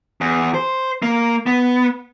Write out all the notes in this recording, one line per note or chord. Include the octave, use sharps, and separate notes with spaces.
E2
C5
A#3
B3